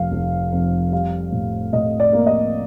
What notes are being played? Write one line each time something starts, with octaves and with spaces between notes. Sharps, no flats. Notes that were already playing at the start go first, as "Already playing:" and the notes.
Already playing: F1 F2 F5
F1
F2
G3 F5
A2
A2 D#5
D5
A#3
D#5